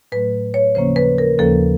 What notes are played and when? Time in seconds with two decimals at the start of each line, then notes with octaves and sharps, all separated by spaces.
0.12 A2 F#3 A3 B4
0.54 C#5
0.75 D#2 C#3 F3 A#3 C#4 C5
0.96 B4
1.18 A#4
1.39 D#2 C#3 F3 A#3 C#4 A4